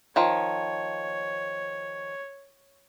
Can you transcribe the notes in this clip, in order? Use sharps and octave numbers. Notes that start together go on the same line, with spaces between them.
D#3 F3 C#5